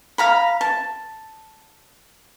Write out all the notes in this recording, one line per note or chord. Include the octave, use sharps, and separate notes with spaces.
F5 A#5 B5
A5